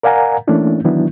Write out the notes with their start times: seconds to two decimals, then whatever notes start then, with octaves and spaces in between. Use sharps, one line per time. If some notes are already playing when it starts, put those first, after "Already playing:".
0.03 A#4 D5 F5 F#5 G#5 A#5
0.47 E3 A3 A#3 C#4 D4 E4
0.84 D#3 E3 F#3 B3 D4 E4